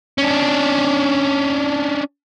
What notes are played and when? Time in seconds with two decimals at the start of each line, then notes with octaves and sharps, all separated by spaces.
0.18 C#4 D4